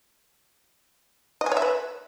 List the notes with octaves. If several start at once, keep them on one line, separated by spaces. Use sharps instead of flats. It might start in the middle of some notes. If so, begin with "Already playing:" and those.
D#5
G#5
C#5
E5
B4